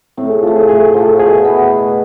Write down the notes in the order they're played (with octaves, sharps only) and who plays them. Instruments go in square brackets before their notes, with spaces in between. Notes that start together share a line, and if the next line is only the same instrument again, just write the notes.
[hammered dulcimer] A2 [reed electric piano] C4
[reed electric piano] G#4
[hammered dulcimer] F3 A3 [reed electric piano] F4
[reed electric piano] G#4
[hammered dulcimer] A2 [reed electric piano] G#4
[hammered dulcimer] F3 A3
[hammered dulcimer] B2 [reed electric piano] G#4
[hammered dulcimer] B3 E4 B4
B2